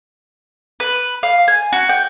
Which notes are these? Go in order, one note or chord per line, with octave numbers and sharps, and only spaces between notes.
B4
F5
G#5
F#4
G5